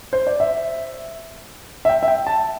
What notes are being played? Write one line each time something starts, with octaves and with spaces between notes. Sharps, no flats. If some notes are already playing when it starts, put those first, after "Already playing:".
C5
D5
E5
E5
G5
E5
G5
A5